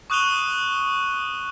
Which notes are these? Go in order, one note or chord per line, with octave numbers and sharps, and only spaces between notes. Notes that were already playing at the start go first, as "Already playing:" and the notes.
C#6 D#6 F#6 D#7 F7 G7